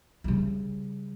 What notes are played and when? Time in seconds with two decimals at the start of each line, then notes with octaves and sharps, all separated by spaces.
0.24 C#3 G3